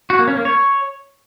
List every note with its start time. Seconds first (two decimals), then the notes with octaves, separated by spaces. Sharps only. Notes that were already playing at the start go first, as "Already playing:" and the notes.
0.10 F#4
0.19 A#3
0.28 C#4
0.36 A#3
0.45 C#5